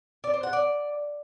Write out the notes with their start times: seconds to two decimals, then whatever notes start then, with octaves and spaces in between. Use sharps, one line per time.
0.24 D5
0.33 C5
0.43 F#5
0.53 D5